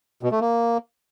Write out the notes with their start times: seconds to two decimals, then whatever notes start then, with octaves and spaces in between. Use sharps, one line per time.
0.23 B2
0.32 A3
0.40 A#3